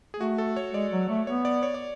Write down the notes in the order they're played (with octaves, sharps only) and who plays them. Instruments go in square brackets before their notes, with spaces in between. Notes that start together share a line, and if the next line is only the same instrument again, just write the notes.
[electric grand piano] G#4
[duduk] A3 [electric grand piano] F#4
[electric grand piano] A4
C#5
[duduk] G#3 [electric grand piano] D5
[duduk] F#3
A3
[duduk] B3 [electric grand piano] C#5
[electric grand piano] D5
C#5
D5